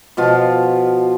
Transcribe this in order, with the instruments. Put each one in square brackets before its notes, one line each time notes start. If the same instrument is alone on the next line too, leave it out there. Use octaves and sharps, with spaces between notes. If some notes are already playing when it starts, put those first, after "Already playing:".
[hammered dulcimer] B2 F3 F4